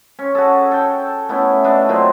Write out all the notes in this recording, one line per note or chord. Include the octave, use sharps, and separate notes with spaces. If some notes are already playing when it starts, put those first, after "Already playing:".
C#4
F#4 G#4 A4
A4 G5
A3 B3 C#4 E4
B3 D4 A4 D#5
A#2 F#3 C4 D#5